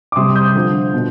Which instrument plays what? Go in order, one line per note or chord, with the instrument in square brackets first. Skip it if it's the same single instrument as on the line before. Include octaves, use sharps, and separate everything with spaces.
[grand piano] D6
C3 G3 C6 D#6
D#6 G6
D3 F3
B2